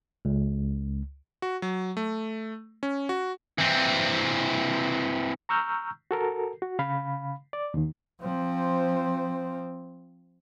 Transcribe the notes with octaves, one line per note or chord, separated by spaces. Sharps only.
C#2
F#4
F#3
A3
C#4
F#4
E3 C4
A#5 C#6 E6 F6 G6
F#4 A4 A#4
F#4
C#3 F5 B5
D5
D#2 D#3
F3 C4